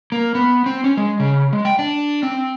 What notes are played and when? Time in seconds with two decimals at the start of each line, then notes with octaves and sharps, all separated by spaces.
0.12 A#3
0.35 B3
0.66 C4
0.84 C#4
0.97 G#3
1.20 C#3
1.53 G#3
1.65 G5
1.79 D4
2.23 C4